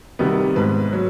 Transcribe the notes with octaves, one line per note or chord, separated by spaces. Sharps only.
C3 D#3 G3 B3
G#2 B4
F#3